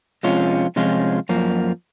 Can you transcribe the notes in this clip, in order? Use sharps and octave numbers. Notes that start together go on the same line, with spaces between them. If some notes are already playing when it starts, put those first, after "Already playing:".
C3 F3 G#3 C#4 F4
C3 F3 G#3 C#4 F4
F#2 F3 A#3